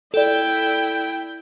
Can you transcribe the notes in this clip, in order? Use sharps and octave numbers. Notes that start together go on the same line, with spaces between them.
E4 A4 D5 G5